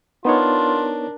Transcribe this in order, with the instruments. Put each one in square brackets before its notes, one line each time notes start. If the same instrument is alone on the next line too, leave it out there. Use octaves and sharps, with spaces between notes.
[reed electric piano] B3 D#4 C#5 [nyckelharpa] D4 A#4 [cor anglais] F4